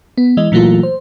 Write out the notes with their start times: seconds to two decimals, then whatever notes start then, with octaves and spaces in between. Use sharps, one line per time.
0.18 B3
0.37 E3 G#3 D#5
0.52 A#2 E3 F#3 A3 A#3 F4
0.83 C5